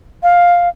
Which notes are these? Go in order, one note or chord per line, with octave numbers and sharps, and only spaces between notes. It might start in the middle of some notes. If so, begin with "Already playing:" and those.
F5